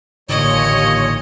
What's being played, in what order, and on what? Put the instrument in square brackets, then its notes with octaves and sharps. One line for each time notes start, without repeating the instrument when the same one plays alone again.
[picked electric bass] A1 D3 [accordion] D#2 A#2 C#5 [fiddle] D#5